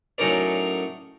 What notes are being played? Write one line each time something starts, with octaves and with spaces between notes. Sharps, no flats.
A2 F#3 C#4 D#4 A#4 D5